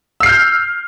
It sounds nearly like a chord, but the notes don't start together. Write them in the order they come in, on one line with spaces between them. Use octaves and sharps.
E6 C7 F6 G6